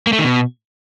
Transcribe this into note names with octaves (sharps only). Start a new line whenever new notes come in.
A#3
A3
D#3
B2